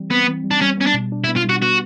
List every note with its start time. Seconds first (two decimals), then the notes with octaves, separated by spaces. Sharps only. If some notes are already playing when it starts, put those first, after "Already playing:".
Already playing: E3 G3 C4
0.11 B3 C4
0.28 E3
0.44 G3
0.51 D4
0.61 G3 C#4
0.77 B3 C#4
0.86 D4
0.94 B2
1.12 D4
1.24 E4
1.28 B3
1.36 F4
1.44 G3
1.49 F#4
1.62 B3 F#4